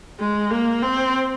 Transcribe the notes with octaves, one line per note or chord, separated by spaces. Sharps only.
G#3
A#3
C4